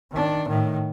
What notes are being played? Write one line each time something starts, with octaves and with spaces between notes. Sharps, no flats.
D#3 D4
A2 D#3